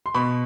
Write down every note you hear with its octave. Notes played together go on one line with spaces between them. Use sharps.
C6
B2 B5 C#6